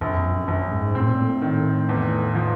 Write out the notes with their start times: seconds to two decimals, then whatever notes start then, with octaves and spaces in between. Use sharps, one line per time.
0.01 A#1 F2
0.24 F#2
0.48 A#1 F#2
0.71 G#2
0.95 A2 C4
1.08 A#2
1.21 A2
1.42 D#3
1.89 E2
2.35 F3